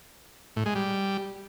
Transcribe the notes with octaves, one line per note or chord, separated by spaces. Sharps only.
A2
G#3
G3